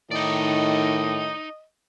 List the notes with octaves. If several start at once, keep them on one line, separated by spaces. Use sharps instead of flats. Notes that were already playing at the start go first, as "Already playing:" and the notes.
A2 D#3 D#4 D5 D#5